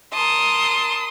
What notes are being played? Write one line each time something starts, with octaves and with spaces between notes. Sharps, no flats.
A#4 A5 C6 D#6